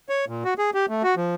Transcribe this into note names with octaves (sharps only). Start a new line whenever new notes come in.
C#5
A#2
F#4
G#4
G4
A3
F#4
F3